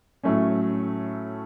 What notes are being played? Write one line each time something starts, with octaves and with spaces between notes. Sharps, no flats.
A2 F#3 A3 C#4